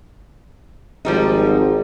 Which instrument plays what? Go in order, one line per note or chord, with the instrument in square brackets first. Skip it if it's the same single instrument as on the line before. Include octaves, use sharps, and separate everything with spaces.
[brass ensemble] G#1 [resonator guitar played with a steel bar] F3 G3 D#4